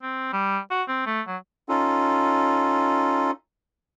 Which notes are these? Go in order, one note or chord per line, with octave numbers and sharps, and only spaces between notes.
C4
G3
F#4
C4
A3
F#3
C#4 D#4 F4 A4